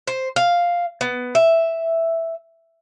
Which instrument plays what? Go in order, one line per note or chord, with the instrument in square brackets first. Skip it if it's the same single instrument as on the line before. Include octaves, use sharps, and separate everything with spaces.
[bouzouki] C5
F5
B3
E5